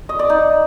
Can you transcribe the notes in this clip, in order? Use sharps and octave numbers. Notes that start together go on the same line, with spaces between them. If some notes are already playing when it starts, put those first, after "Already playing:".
D#5
D5
D#4